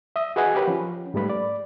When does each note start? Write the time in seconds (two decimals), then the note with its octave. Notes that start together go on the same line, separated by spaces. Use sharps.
0.16 E5 D#6
0.36 F#4 G#4 B4 D#5 F#5 G#5
0.55 G4 A#4 B4 C#5
0.68 F3 C#4
1.14 G#2 G3 A3 B4 B5
1.30 D5